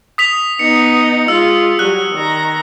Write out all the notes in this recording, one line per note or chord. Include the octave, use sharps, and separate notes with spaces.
D#6 B6 F7
B3 D#4 C#7
G#3 F4 E6
F#3 G3 F#6
D#3 A#5